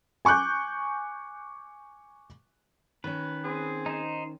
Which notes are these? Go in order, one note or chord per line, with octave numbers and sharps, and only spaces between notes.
G#5 C#6 D6 F#6 G6
D#3 C#4 B4
C4 G#4
D#4 C5